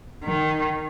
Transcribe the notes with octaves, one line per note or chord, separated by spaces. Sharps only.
D#3